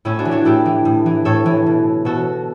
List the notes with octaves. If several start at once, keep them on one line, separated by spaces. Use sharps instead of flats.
A2 C#4 E4
D4 F#4
E3
D4 F#4
A2 E4 G4
E3
A2
E3
A2 A4 C#5
E3
B2
B2 F#4 A4